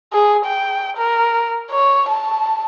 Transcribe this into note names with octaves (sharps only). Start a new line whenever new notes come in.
G#4
G5
A#4
C#5
A5